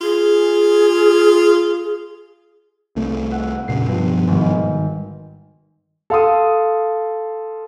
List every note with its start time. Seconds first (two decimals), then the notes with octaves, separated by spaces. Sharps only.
0.01 F4 G#4
2.96 C2 C3 A3
3.31 E5 F#5
3.68 F1 A#2 C#3 C7
3.88 G2 B2 F3
4.27 G#1 G#2 D#3
6.10 A4 F5 C6 D#6